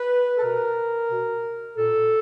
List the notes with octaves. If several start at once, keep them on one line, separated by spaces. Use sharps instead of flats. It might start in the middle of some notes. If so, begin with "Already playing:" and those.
Already playing: B4
A4
B2 A#4
B2
A#2 A4